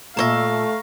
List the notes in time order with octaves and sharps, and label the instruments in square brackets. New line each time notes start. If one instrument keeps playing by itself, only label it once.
[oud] A#2 C5 E5 [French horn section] A3 [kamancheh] F5 [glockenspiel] A#5 C#6 A#6